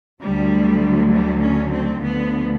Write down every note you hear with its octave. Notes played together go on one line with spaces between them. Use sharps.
D2 D3 F#3 G3
G3
C#4
C4
D2 D3 F3 B3